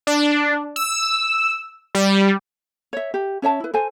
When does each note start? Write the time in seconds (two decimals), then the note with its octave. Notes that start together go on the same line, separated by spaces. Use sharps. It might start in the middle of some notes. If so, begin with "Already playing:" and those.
0.07 D4
0.76 E6
1.95 G3
2.93 C#5 E5
3.14 G4
3.42 C#4 C#5 E5 A5
3.60 E4 B4
3.74 A4 C5 G#5